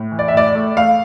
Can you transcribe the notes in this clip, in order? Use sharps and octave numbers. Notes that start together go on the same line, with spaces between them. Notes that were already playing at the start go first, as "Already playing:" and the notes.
Already playing: A2
E3
D5
E5
A2 D5
A3
A3 F5